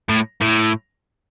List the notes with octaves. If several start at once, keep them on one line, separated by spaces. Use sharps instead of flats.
A2
A2